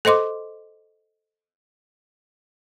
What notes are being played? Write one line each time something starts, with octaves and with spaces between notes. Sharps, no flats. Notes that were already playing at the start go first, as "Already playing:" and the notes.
A4 C5 D#5 C6 D6